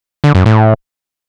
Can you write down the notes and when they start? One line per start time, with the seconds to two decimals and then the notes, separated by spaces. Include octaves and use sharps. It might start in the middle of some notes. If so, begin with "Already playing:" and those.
0.24 D3
0.35 F#2
0.46 A2